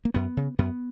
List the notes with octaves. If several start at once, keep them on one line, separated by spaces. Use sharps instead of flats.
A#3
F#2 B3
C#3
F#2 B3